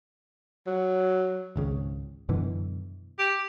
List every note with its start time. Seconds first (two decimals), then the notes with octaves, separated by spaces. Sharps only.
0.67 F#3
1.56 G#1 C#2 C#3
2.29 F#2 B2 D3 E3
3.18 G4